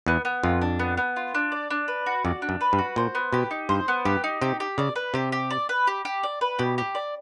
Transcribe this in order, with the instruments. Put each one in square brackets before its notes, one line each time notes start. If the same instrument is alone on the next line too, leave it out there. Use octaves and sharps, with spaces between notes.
[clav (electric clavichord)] E2 [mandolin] B3
[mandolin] B3
[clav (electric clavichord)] F2 [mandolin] F4
[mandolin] D4
B3
B3
F4
D4
D5
D4
B4
F#4
[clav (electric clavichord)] F2 [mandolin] D5
[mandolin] D4
[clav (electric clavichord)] F#2
[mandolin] B4
[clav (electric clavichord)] G2
[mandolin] F#4
[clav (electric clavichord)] A#2 [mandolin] C5
[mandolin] B3
[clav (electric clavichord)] B2 [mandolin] G4
[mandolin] D#4
[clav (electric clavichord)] G2 [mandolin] C5
[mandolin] B3
[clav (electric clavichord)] G2 [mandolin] G4
[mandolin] D#4
[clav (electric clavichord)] C3 [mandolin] G4
[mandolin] G4
[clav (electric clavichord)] C#3 [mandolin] D5
[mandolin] B4
[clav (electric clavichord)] C3 [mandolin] G4
[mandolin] G4
D5
B4
G4
G4
D5
B4
[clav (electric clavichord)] B2 [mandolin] G4
[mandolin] G4
D5